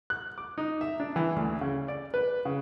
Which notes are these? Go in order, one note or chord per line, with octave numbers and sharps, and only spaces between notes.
F#6
D6
D#4
E5
D4
E3
D2
C#3
D5
B4
C#3